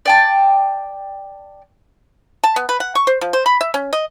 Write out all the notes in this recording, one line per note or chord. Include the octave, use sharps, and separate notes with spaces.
D5 G5 A5
A5
B3
B4
F#5
C#6
C5
F3
C5
B5
E5
C#4
D#5